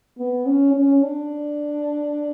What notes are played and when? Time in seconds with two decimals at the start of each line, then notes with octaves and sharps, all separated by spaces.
0.19 B3
0.46 C#4
0.75 C#4
1.03 D4